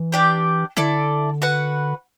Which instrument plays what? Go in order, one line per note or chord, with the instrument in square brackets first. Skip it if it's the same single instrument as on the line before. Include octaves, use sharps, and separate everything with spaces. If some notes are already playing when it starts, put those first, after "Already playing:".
Already playing: [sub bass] E3
[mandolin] D4 G4 D5 G5
[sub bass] D3 [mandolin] E4 A4 D5
[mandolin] F#4 B4 F#5